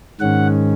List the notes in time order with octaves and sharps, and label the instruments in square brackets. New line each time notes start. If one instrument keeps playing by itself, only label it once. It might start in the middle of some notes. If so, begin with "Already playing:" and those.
[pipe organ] G#2 D#3 G#3 C#4 F#5